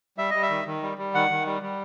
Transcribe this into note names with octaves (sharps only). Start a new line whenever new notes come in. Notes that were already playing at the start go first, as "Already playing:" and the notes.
G3 E5
G3 D#5
E5
D#3
D#3
G3
G3
D#3 F#5
D#3
G3
G3